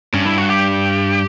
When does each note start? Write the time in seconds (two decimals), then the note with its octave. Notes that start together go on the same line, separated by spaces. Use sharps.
0.14 G2 C#4
0.26 E4
0.38 F#4
0.50 G4